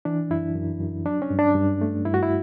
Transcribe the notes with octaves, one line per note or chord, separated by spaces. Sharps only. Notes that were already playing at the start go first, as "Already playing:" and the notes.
E3 D4
F#2 E4
F#2
F#2
F#3 D4
C#4
G2
D4
G2
A3
G2 E4
F#4
E4